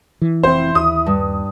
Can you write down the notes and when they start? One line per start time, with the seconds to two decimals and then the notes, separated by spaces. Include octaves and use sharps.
0.22 E3
0.43 F1 C4 E4 C5
0.75 D#2 D#6
1.06 G2